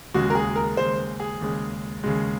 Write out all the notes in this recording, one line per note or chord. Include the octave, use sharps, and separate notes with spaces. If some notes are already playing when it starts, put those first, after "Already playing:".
D#2 C#3 G#3 F#4
A#4
G#4
A#4
D#2 C#3 G#3 C5
G#4
D#2 C#3 G#3
D#2 C#3 G#3